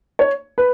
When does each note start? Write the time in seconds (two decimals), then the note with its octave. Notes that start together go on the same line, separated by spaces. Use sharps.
0.19 C#5
0.58 B4